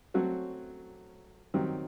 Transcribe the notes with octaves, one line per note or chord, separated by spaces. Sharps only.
F#3 A3 C4 F#4
D#3 F#3 C4 G4